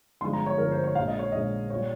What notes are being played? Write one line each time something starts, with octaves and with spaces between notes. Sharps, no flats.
G1 G2 F3 G#3 C6
A#5
C#5
G1 G2 F3 G#3 A#4
C5
C#5
A#1 A#2 G#3 F5
D#5
C#5
A#1 A#2 G#3 D#5
A#2 G3 C#5